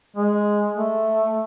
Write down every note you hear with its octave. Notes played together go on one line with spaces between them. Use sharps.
G#3
A3